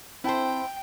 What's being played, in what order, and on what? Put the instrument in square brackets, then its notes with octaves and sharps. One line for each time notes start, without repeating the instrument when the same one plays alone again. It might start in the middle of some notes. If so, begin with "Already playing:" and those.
[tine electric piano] C4 A5 [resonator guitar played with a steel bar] E4 C5 [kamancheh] G5